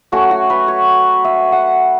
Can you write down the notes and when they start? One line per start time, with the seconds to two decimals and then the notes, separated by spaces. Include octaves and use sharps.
0.12 F#3 A3 C#4 F#4
0.31 F#4
0.50 B4
0.68 C#5
1.25 E5
1.52 F#5